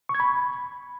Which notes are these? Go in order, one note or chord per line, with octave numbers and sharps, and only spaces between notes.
C#6
G#6
B5